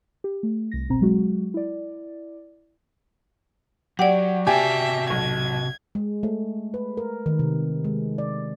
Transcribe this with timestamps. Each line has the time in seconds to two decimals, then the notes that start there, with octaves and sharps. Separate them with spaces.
0.24 G4
0.43 A3
0.72 C2 A#6
0.89 G1 B2 C4 A#5
1.01 F#3 G#3 F#4
1.54 E4 D5
3.99 F#3 G4 D5 F#5
4.47 C3 F#4 G4 E5 G#5 A5
5.10 B1 G#6
5.95 G#3
6.23 A3
6.74 B4
6.97 A#4
7.26 D#3
7.39 C3
7.84 G#3
8.18 D5